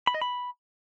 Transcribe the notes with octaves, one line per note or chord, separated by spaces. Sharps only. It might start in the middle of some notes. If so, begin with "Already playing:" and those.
B5
D#5
B5